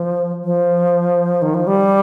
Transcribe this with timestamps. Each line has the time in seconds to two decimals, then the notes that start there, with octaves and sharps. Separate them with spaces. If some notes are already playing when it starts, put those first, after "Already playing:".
Already playing: F3
0.44 F3
1.42 D#3
1.54 F3
1.67 G3